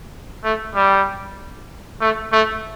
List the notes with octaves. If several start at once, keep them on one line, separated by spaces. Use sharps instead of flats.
A3
G3
A3
A3